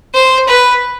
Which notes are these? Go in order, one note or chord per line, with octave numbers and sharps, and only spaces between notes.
C5
B4